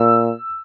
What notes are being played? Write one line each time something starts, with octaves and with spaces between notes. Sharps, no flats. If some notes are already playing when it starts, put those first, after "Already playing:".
Already playing: A#2 E6